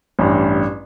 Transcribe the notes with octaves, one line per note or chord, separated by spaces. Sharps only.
A1 G2